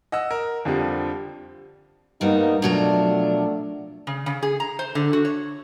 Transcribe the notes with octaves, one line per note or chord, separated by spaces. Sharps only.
D#5 F#5 E6
A#4
F2 D3 F3 G3
G2 G3 A#3 B3 D#4
B2 F3 F#3 A3 D4 A#4
C#3
C#3
G#4
A#5
C5
D3
F#4
C#5